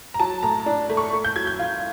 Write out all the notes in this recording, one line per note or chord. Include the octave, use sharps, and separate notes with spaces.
A#5
F#3 A5
A2 A#5
D4
A3
C#6
A3
G6
F#3 G#6
G6
F4